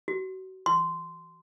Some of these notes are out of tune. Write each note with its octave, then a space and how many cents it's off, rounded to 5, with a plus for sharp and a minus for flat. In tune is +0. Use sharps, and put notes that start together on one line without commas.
F#4 +30
C6 -15